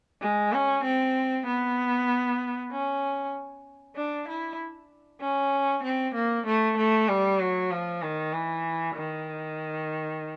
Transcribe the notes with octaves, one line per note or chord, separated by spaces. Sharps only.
G#3
C#4
C4
B3
C#4
D4
E4
C#4
C4
A#3
A3
A3
G3
F#3
F3
D#3
E3
D#3